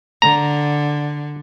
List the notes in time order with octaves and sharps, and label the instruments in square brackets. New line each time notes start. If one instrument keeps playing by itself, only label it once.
[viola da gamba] D3 [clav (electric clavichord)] A#5